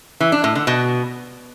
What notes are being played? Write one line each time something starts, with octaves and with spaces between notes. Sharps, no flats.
E3
D4
A2
D3
B2